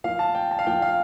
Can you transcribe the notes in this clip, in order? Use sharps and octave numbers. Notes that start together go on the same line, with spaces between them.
A#2 F3 A#3 F5
A5
G5
A5
F5
A#2 F3 A#3 G5
F5